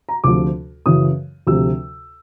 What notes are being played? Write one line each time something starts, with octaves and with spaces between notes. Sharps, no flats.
A#5
D2 C3 F3 D6
F#2 C#3 E3 D#6
D2 C3 F3 E6